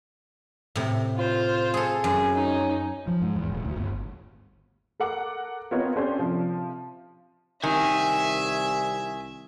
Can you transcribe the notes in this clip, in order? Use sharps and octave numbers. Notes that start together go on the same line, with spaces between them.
A2 C3
F4 C5
G#4 A4
F#2 G#4
C#4 D#4
F3
G#2
E2
D#1
D2
G1
A4 A#4 F#5 D6
B3 C4 F4 A#4 C#5 D#5
C#4 D4 G4 A4 C5
C3 F3
C2 D#3 E5 G#5